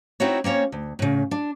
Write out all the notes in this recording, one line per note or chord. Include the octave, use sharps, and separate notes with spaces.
C4 D#4 E4 F#4 C#5
A#3 C4 C#4 C#5
D2
A2 C#3
D4